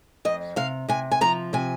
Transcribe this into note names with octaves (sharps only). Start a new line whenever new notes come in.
F2 D#5
C3 F5
C3 G#5
G#5
F3 A#5
C3 G#5